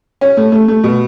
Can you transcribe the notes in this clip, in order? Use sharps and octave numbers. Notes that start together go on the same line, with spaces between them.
C#4
A3
A3
A3
B2